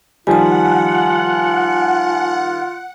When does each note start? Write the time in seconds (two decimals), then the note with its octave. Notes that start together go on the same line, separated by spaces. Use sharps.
0.27 D#3 F3 G3 F4 F#5 G#5 A5